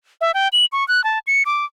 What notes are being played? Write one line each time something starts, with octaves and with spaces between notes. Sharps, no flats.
E5
G5
F#7
C#6
F#6
A5
C#7
D6